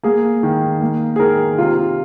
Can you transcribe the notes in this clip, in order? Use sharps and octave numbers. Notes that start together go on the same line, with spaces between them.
A#3 G#4
D#3
A#3
G#4
D#3 A#4
C3 F4